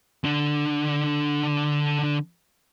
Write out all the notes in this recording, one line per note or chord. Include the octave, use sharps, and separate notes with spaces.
D3 D4